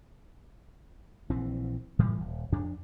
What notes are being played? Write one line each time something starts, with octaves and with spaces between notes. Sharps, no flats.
A#1 E3 C4
A2 E3 F3 G3
D#1
F2 D4